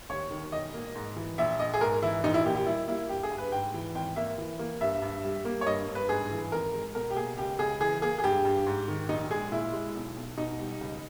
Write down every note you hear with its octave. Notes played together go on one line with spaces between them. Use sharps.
D#2 C#5
D#3
E1 D#5
A#3
G#2
E3
A#1 E5
A#1 D#5
G#4
G#2 A#4
E3 E4
A#1 D#4
E4
A#3 G4
G4
G3 E4
A#3 E4
G2 G4
G#4
G2
B4
G#2 G5
E3
G#1 G5
A#3 E5
E3
A#3
G2 E5
G2
G3
A#3
C#5
G2 D#5
G2
B4
G#2 G#4
E3
G#1 A#4
G#3
B2 A#4
G4
A#3 G#4
C#2 G4
C#2 G#4
E3 G#4
A#3 G#4
G#4
G2 G4
G2
G#2
D#3
A#1 D#4
G#3 G#4
A#2 E4
G#3
B1
B1
B2 D#4
G3
C#2